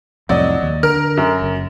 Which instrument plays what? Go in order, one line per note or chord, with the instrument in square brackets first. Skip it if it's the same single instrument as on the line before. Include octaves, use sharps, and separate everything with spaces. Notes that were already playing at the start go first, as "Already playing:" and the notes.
[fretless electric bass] C2 F2 A2 [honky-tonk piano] F#3 [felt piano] D5 D#5
[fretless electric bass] D#2
[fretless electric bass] D3 [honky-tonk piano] A#4 [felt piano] F6
[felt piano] F#2
[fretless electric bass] F#1